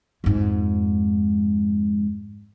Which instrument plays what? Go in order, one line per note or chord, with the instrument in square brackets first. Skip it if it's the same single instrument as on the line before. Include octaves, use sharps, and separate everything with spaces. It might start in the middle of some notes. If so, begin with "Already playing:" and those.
[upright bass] F2 G#2